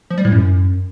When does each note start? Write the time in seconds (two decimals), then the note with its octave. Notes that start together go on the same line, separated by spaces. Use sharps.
0.10 F3
0.18 G3
0.25 A2
0.32 F#2